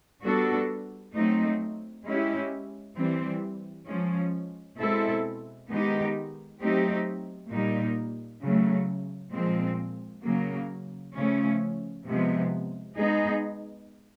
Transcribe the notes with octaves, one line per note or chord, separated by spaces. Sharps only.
G3 B3 D4 F#4 A4
F#3 A3 C4 D#4
G#3 C#4 E4 G4
E3 G3 C4
F3 G#3 C#4
B2 G#3 C4 E4 A4
D#3 G#3 B3 D#4 G4
F#3 A3 C4 D#4 G4
A#2 G3 A#3 D#4
C#3 F#3 A3
A#2 F3 G#3 C4
C#3 F#3 A#3
C#3 F3 A3 C#4
C3 F3 G#3 B3
G#3 B3 D#4 G#4